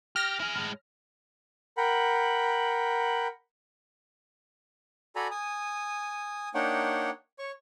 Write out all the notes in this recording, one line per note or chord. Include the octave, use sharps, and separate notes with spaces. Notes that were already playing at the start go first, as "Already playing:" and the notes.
G4 F6 A#6
E4 G#4
A2 G#3
A#4 F#5 G5 B5
F#4 A4 D5 G#5 A#5 B5
G#5 D#6
A#3 D4 D#4 C#5 F#5 G5
C#5 C#6